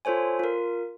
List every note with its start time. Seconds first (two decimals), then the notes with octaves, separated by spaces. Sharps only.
0.05 F4 A4 C5 C#5 G#5
0.39 F4 A#4